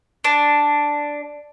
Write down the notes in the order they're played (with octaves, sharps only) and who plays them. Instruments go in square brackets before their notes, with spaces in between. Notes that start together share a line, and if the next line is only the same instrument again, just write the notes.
[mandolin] D4